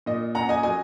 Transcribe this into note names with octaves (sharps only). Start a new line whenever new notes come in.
A#2 D#5
C#4 F#5 A#5
D#5 G#5
F#3 D#5 G#5